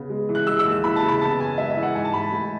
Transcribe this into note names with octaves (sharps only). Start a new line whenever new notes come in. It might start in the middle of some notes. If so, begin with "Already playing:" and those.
Already playing: C#3 B3
G#3
E3
F#6
G#3 E6
E6
D#2
E3 B5
A5
C#3
B5
B3 A5
F#2 G#5
G#3 E5
E5
E3
F#5
G#2 G#5
A5
G#2 B5
A5
A3